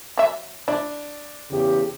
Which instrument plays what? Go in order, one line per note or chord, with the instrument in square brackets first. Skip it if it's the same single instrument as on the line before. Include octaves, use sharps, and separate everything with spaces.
[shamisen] F#3 E5
[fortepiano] D4 [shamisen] E4
[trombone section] E2 C#3 G4